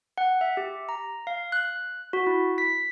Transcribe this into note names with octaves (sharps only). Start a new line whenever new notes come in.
F#5
E5
G4
A#5
F5
F#6
F#4
E4
B6